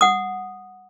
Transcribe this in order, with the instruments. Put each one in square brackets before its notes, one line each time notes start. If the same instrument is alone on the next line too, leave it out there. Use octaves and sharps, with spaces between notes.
[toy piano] F#5 D#6